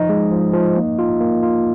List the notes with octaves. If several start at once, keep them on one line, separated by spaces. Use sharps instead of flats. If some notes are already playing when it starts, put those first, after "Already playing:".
Already playing: F3 D#4 D#5
G#3
F3
F3
A#3
F4
A#3
F4